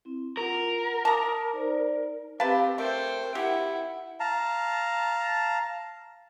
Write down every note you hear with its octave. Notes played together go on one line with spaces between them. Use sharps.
C4 E4
F4 A#4 F#5
A5 A#5 D6 D#6
D#4 C5 D5
C4 G4 B4 F5 A5
A3 A#4 C5 G5
E4 G4 F#5
F5 A5 A#5